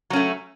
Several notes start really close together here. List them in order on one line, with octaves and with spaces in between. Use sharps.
F#3 C#4 A3